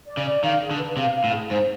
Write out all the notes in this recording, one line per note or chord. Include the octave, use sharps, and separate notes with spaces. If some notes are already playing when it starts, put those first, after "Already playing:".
D5
C#3
D5
D#3 F5
G#4
D3
B4
C3 F5
F5
A2
G#4
G#2 C5